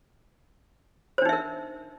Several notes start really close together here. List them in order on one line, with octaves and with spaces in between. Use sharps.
C5 D4 D#4 E5 A#4